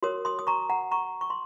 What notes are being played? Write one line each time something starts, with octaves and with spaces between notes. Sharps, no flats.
F#4 A#4 C#5 C6 D#6
C6 D#6
D#6
A#5 C#6
F#5 A#5
A#5 C#6
C#6
C6